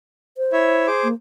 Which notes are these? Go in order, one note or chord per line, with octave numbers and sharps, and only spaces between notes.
C5
E4 C#5 E5
G#4 C5 D6
A#3